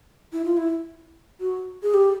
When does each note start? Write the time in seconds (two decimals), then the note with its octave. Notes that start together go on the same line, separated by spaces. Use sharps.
0.33 E4
0.45 F4
0.57 E4
1.41 F#4
1.83 G#4
1.94 G4